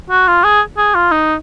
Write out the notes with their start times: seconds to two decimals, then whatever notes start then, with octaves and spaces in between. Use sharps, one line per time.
0.10 F#4
0.27 F4
0.43 G#4
0.77 G#4
0.94 F4
1.11 D#4